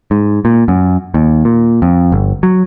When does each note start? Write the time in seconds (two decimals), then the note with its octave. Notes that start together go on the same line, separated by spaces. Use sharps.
0.11 G#2
0.45 A#2
0.68 F#2
1.14 D#2
1.45 A#2
1.82 F2
2.12 G1
2.43 F#3